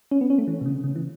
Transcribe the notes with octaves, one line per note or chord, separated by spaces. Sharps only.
C#4
B3
C#4
A3
E3
B2
C#3
C#3
E3